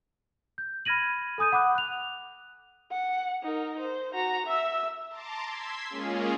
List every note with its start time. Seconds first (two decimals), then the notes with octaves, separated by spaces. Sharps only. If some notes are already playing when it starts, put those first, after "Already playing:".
0.58 G6
0.85 B5 F6 G#6 A#6 D#7 F#7
1.38 A4 G#5 D#6 G6 D#7
1.52 F#5 B5 D6 D#6 F#6
1.75 F#6 F7
2.91 F#5
3.43 D#4 A#4
3.79 C5
4.14 F#4 A#5
4.46 E5 E6
5.08 A5 A#5 C6 D6 A6
5.45 C6 E6 G#6 B6
5.89 G#3 A#3 C#4 F4 G#4